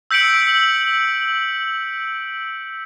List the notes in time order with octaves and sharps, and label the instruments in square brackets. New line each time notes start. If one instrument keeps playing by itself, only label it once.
[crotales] E6 G6 B6 C#7 D7 F#7